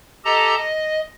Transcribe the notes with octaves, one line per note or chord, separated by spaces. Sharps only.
G4 A4 D#5 A5 A#5
D#5